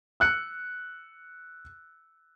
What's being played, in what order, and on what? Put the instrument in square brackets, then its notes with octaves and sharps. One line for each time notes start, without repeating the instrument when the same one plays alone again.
[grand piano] E6 F#6 C#7